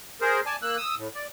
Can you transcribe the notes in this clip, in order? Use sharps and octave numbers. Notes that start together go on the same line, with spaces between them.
G#4 A#4 C5
D5 G#5 A5
A#3 E6 F#6
D#6 E6
A2
D5